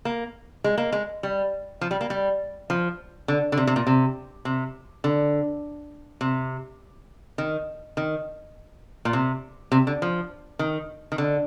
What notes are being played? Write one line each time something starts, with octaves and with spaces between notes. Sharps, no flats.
A#3
G#3
A#3
G#3
G3
F3
G3
A#3
G3
F3
D3
D3
C3
C3
A#2
C3
C3
D3
C3
D#3
D#3
A#2
C3
C3
D3
F3
D#3
D#3
D3